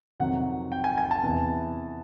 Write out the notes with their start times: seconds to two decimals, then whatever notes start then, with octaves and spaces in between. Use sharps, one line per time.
0.20 F2 C3 D#3 F#3 F#5
0.72 G5
0.84 G#5
0.98 G#5
1.11 A5
1.23 E2 C3 E3